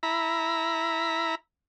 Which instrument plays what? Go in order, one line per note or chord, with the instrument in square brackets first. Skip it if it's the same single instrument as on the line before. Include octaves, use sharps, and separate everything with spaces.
[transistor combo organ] E4 A#5 B5